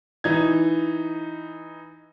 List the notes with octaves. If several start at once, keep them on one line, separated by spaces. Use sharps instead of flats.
E3 D#4 G#6